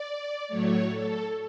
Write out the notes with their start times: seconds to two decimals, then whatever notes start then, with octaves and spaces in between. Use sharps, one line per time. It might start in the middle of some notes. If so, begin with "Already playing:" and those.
Already playing: D5
0.48 A2 F#3 A3 C#5
0.87 A4